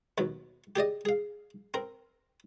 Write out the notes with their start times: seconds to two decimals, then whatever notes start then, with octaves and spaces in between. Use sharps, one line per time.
0.18 D#2 B2 F#3
0.76 G4 G#4 D5 D#5
1.05 G#4 F5
1.74 C4 A#4